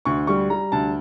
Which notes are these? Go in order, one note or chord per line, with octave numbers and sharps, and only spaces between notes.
D2 C#6
G3 C#6
G3 A#5
D2 A5